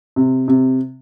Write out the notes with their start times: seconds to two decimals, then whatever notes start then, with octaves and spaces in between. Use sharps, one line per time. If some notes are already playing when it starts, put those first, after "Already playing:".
0.16 C3
0.48 C3